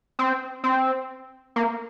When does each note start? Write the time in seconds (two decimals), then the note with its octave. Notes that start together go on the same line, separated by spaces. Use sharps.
0.19 C4
0.64 C4
1.56 A#3